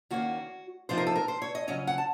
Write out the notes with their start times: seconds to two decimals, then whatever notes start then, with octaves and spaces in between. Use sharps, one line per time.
0.11 D#3 A#3 C#4 F#4
0.89 F2 C3 F3 C4 D#4 C5
0.98 A#4
1.07 A4
1.15 A#4
1.28 C5
1.42 C#5
1.55 D#5
1.68 F2 C#3 F#3 C#4 D#5
1.87 F#5
1.98 A5